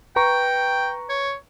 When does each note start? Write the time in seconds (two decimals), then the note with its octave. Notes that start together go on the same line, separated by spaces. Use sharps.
0.16 B4 G5 A#5 C#6
1.09 C#5